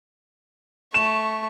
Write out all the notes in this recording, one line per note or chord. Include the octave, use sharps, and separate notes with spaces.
A3 C#6 E7